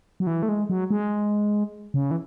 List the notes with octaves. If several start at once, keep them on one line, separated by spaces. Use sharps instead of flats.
F#3
E3
A3
G#3
F#3
G#3
C#3
E3